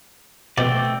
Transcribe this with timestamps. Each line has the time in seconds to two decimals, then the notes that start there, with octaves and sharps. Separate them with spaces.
0.58 B2 A3 C4 D5